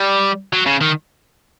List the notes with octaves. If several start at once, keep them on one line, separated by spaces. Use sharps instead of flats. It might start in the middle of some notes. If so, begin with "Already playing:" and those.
Already playing: G3
F#3
C#3
D#3